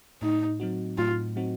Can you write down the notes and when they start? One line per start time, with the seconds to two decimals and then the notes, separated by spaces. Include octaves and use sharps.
0.22 A2 D#4
0.60 F#3 C4 D#4 F#4
0.98 A2 F4
1.36 F#3 C4 D#4 F#4